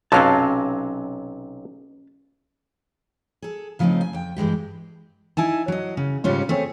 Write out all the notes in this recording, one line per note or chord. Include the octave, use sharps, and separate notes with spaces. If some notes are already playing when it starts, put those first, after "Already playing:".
B1 C3 F#3 C#4 F5 A5
G#4 A4
C#3 F3 G3 A3 C4 D#4
G#5
F2 G5
G2 E3 G#3 G4
D#4 E4 G#5 A5
F#3 D#5
C#3
G#2 C#3 G3 C#4 F4
A3 C4 G#4 C#5